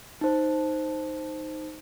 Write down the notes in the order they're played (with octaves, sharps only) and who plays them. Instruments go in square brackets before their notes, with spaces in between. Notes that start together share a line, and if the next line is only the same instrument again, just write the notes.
[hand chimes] D#4 C5